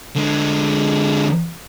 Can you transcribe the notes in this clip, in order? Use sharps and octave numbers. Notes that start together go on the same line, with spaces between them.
D3 G#3